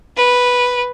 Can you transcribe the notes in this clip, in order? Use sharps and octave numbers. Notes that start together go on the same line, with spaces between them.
B4